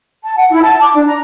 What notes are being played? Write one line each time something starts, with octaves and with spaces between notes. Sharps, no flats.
A5
F#5
E4
A5
D6
D4
A#5